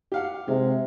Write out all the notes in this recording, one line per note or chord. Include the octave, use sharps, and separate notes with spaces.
G4 F5 F#5
C3 G#3